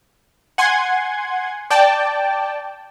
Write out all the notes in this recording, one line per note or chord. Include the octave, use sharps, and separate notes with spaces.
F#5 G#5 C6 G#6
D5 G5 A5